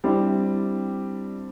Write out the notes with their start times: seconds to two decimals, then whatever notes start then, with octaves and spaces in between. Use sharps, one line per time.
0.04 G3 C4 D4 E4